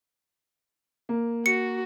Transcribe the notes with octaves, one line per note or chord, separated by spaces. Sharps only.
A#3
F#4 C#7